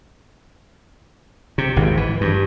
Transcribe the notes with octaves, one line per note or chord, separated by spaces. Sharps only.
C3
G#1
E3
G2